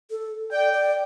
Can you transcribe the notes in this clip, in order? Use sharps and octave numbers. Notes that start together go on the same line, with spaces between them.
A4
D5 G5
D5